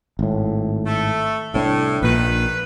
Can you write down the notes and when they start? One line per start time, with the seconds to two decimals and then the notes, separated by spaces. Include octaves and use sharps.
0.19 G#1 A2
0.86 A3
1.54 C2 A2 C4 D4
2.03 A#1 A#2 D#3 B4